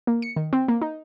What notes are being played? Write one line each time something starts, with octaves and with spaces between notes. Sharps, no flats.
A#3
C#7
D#3
C4
A#3
D#4